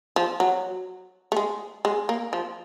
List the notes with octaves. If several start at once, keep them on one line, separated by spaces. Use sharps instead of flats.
F3
F#3
A3
G#3
G#3
A#3
F3